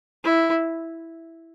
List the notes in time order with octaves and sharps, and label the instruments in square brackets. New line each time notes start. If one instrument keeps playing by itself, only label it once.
[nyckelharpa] E4